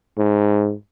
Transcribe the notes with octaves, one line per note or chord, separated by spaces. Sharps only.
G#2